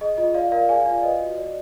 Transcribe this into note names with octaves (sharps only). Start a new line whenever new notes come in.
G#4 D#5
F4 D#5
D5 F5
A#4 D5 F5
G#4 F5 G#5
F4 D5 F5
B4 D#5
F#4
D5